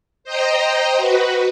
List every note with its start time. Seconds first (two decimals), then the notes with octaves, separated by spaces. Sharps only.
0.24 C5 D#5 G5 A#5
0.97 F#4 B4